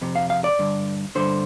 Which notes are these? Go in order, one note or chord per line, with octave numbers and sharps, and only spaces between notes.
F2 C3
F5
F5
D5
G2 D3
G2 D3 C5